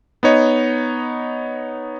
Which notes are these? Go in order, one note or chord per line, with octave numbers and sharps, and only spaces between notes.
B3 D#4 C#5 D#5